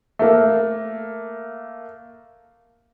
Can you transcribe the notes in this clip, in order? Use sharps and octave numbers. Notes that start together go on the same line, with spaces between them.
A3 A#3